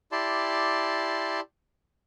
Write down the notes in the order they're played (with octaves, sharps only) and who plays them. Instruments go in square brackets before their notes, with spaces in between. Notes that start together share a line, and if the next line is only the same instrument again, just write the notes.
[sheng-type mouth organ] E4 G4 D5 A5 C6